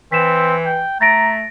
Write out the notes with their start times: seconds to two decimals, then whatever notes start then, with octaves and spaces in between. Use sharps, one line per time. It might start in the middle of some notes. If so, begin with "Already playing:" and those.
0.12 E3 C4 B6 E7
0.66 G5
1.01 A3 A#5 A6 A#6 D7